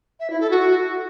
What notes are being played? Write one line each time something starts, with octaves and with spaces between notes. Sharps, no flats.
E5
E4
A4
F#4